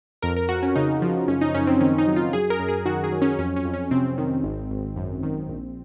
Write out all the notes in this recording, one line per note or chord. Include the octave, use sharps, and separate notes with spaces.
F2 A#4
A#4
F2 F#4
C#4
C#3 D#4
F3
F#2 C#4
D#4
F#2 C#4
C4
D#3 C#4
D#4
F#3
F4
F#2 G#4
A#4
F#2
G#4
D#3 F#4
G#4
F#3
C#4
F2 C#4
C#4
F2
C#4
C3 C4
D#3
G#1
G#1
F#2
D#3
A#1